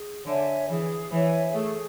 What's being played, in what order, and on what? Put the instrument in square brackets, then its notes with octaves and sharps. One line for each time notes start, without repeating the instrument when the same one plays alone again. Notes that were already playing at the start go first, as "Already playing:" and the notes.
Already playing: [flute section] G#4
[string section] D3 [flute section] C#5 E5 G#5
[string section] E3 [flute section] G#4
[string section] E3 [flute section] C#5 E5 G#5
[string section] A3 [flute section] G#4